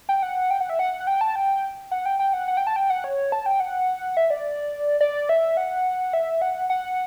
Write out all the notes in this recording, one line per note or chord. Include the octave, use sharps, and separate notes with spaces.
G5
F#5
G5
F#5
E5
F#5
F#5
G5
A5
G5
F#5
G5
G5
F#5
F#5
G5
A5
G5
F#5
C#5
A5
G5
F#5
E5
D5
D5
E5
F#5
E5
F#5
F#5